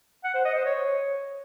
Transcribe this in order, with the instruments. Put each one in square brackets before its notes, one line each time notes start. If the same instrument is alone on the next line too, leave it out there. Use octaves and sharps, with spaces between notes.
[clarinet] F#5
C5
D#5
C5
C#5